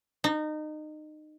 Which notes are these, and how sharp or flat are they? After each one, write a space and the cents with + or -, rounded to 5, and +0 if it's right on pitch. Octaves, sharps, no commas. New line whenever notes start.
D#4 -25